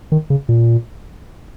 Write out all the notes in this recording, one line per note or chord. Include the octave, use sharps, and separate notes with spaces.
D#3
C#3
A#2